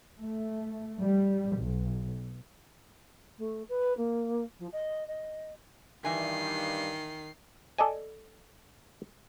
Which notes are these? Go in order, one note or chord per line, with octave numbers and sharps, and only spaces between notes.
A3
G3
B1
A3
B4
A#3
F3
D#5
D#5
G2 D#3 E3 G#5 C7
A4 D5 D#5 G#5